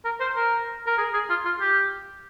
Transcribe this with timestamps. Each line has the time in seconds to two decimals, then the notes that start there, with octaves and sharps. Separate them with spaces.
0.05 A#4
0.20 C5
0.36 A#4
0.87 A#4
0.98 G#4
1.14 G#4
1.29 F4
1.45 F4
1.61 G4